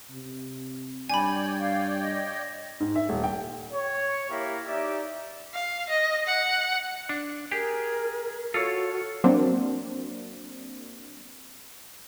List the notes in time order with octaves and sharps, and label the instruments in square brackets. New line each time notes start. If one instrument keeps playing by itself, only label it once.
[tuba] C3
[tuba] G2 [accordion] C#5 D5 G5 [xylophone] G#5 B5
[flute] F5
D#5
[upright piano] G#2
E5
D#1
G5
[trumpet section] C#5
A#3 E4 G4
D#4 G4 D5 E5
[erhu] F5
D#5
F#5
[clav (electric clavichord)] D4
[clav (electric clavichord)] G4 [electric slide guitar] G#4 [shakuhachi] A#4
[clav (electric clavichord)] F4 [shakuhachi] F#4 [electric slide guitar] A4 C#5
[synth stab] F#3 A#3 C4 D4